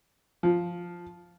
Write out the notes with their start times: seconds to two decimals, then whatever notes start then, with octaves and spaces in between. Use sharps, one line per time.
0.43 F3